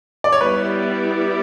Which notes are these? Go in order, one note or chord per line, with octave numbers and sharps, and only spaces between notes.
D5
C#5
G3 B3 E4 G4 B4 D5